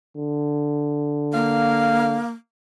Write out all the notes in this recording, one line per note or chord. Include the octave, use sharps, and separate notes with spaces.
D3
A#3 F5